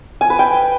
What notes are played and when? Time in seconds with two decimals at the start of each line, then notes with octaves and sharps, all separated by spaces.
0.21 G#5
0.30 B4
0.39 G5